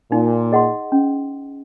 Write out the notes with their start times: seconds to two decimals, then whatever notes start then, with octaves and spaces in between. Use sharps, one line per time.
0.11 A#2 D#4
0.52 G#4 D#5 F#5 C6
0.92 C#4